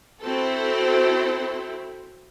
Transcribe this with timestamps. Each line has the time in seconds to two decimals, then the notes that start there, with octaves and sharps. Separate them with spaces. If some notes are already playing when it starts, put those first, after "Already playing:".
0.22 C4 E4 F#4 A4 C5